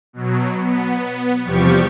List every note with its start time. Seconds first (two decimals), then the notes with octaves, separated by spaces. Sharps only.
0.13 B2 F#3
0.58 B3
1.43 E2 C3 F3 G3 G4 C#6